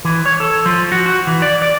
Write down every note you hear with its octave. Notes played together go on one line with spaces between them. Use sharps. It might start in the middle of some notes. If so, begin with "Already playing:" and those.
E3
C#5
A4
F3
F#4
F#4
E3
D5
D5